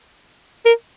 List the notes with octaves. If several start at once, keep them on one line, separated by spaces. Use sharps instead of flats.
A#4